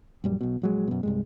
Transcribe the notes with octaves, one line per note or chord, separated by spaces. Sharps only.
A#1 F#2 G3
B1 B2
A#1 F#3 G#3
F#2 B2
C2 G2 G#3